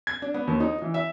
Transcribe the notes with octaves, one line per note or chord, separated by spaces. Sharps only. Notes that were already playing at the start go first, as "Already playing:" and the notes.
G#6
D4
B3
D#2
D#4
E3
E5